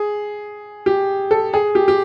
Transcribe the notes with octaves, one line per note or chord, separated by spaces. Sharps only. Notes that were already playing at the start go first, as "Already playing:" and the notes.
Already playing: G#4
G4
A4
G#4
G4
G4